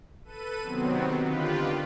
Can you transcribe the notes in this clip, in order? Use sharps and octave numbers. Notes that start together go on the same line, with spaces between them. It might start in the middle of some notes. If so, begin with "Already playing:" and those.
A4 B4 D#7
C3 D#3 F#3 B3 C4
D3 D#3 F4 G4 B4